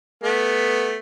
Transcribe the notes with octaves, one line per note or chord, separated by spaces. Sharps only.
A3 B3